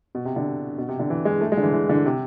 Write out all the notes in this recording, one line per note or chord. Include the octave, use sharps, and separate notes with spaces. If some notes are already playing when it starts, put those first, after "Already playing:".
B2
C3
D3
B2
C3
D3
E3
G#3
A3
G#3
D3
E3
E3
D3
C3